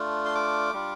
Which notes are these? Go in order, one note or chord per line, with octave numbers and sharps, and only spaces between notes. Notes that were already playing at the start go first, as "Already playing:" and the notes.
Already playing: A3 D4 F4
C6
D6
G3 D4 F4